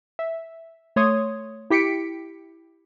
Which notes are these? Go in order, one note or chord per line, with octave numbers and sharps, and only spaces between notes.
E5
A3 C#5 C6 D#6 G#6
E4 G4 B6 C#7 D7